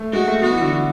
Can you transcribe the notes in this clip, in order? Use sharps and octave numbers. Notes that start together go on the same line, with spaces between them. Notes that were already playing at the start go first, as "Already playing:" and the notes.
Already playing: A3
G#3 F#4
A3
B3 F#4
E3
D3
E3